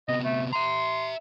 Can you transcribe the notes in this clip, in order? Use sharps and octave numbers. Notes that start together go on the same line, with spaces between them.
C3 B3 D#5
A3
E5 A#5 C6